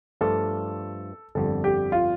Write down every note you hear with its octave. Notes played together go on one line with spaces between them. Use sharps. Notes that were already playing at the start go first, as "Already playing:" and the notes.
G2 F3 A3 D4 F4 A4
G1 F2 D3 G3 A4
G4
F4